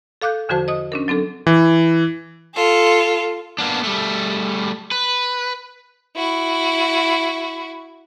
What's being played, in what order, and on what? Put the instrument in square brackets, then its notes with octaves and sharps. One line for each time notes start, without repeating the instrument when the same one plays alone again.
[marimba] A4 F5 D6 F#6 G6
E2 D3 F3 F#4 C5 A5
D#5 D#6
C#4 D4 A#4
F#3 C4 D4 A4
[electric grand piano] E3
[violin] F4 A4
[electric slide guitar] A#3 B3 D4
G3 A3
B4
[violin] E4 F#4